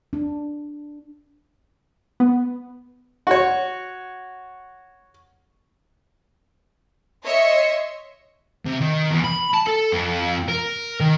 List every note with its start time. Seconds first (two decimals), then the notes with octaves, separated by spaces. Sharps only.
0.13 D4
2.20 B3
3.27 F#4 C#5
7.24 C#5 D#5 E5 C6 C#7
8.66 C3
8.81 D#3
9.11 E2
9.25 B5
9.54 A5
9.67 A4
9.92 F2
10.48 A#4
11.00 D#3